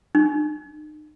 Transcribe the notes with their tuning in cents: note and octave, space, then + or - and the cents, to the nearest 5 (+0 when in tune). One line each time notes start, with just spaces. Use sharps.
D#4 -45